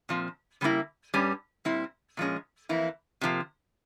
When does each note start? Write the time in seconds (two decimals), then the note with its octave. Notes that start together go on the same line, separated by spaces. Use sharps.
0.09 A#2 F3 C4
0.61 C#3 G3 A#3 E4
1.14 G2 G3 C#4
1.65 A#2 G3 C4 E4
2.17 A#2 F3 G#3 C#4
2.69 F2 E3 A#3 E4
3.21 C3 F3 A#3